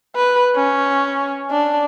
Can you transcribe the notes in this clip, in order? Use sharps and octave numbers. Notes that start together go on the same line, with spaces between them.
B4
C#4
D4